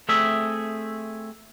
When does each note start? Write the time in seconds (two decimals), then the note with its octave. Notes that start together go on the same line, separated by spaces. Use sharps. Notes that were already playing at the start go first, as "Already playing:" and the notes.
0.09 A3 C4 G#4 E5